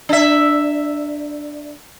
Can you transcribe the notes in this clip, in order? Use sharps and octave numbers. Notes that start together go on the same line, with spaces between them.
D4 E5